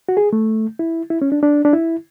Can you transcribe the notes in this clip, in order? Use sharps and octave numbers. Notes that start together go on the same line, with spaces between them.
F#4
G#4
A3
E4
E4
C#4
D4
D4
D4
E4